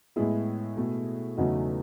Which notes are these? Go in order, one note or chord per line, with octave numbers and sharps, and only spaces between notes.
A2 G#3 B3 E4 G#4
B2 A3
E2 C#3 F#3 A3 D#4 F#4